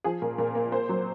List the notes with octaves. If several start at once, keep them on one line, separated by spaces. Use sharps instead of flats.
F3 G#4
A#2 A#4
A#2 A#4
A#3 A#4
A#3 C5
F#3